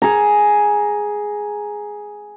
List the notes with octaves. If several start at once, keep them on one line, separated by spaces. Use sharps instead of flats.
G#4 A#5